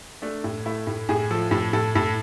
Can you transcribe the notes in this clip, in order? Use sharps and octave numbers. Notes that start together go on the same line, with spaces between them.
A3 D4
A2
A3 E4
A2
A2 G#4
F3 A4
A2 A4
A2 A4
A2 A4